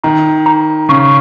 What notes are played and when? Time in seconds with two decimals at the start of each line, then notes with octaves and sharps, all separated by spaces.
0.04 D#3 A#5
0.46 A#5
0.89 C#3 C#6